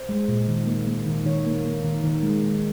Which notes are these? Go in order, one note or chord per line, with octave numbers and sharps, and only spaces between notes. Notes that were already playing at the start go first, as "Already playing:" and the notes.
Already playing: C5
G#3
A#2
D#3
A#3
A#3
D#3
D#3 C#5
A#3
A#3
D#3
D#3
G#3
G#3